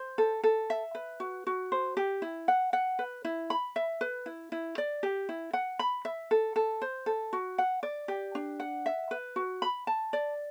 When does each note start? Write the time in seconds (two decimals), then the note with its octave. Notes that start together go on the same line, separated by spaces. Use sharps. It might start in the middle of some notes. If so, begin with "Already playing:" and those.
Already playing: C5
0.18 A4
0.44 A4
0.70 E5
0.95 B4
1.20 F#4
1.47 F#4
1.72 C5
1.97 G4
2.22 E4
2.48 F#5
2.73 F#5
2.99 B4
3.25 E4
3.50 B5
3.76 E5
4.01 B4
4.26 E4
4.52 E4
4.78 D5
5.03 G4
5.29 E4
5.53 F#5
5.79 B5
6.05 E5
6.31 A4
6.56 A4
6.82 C5
7.06 A4
7.33 F#4
7.58 F#5
7.83 D5
8.08 G4
8.35 D4
8.60 F#5
8.86 E5
9.11 B4
9.36 F#4
9.62 B5
9.87 A5
10.13 D5